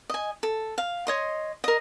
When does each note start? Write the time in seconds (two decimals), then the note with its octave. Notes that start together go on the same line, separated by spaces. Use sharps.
0.10 D#5 G#5
0.43 A4
0.78 F5
1.07 C#5 D#5 C6
1.64 A#4 D#5